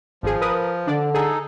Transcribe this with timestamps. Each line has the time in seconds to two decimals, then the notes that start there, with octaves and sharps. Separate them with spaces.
0.23 G#1 F3 G#4
0.41 A#4 B4 D#6
0.87 D3 D4 D5
1.15 D#4 G#4 A4